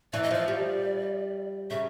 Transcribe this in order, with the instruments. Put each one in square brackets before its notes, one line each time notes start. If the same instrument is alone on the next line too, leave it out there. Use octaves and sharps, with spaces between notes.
[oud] E3 [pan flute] D5
[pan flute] D#5
[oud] F3 [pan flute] D5
[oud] G3
[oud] C#3 [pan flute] E5